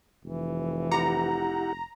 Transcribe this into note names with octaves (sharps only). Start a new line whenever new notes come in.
F1 E3
E4 G4 F#5 A#5